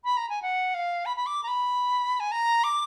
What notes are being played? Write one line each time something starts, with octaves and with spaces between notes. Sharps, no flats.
B5
A#5
G#5
F#5
F5
B5
B5
D6
A#5
B5
G#5
A#5
D6